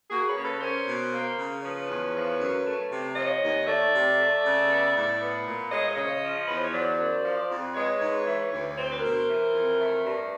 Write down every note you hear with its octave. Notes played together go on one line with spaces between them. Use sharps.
A#3 F#4 G#4
B4 C#5
C#3
A4 B4
C#4 A#4 C5
B2
A#3
C#3
F3 B4 C#5
E2
F3
F#2
A3
C3
F3 C#5 D#5
D#2
A3 D5 E5
C3
A3
C#3
B3
A2
B3
A#2
G#3 C#5 D#5
C#5 D#5
C#3
C#5 D#5
F3
E2 B4
C5
C#5
F#3 C5 D5
F#2
F3
F2
G#3 B4 C#5
G#2
E3
D2
C4 C#5
C5
B4
B2 A#4 C5
E3
F2
A3
G2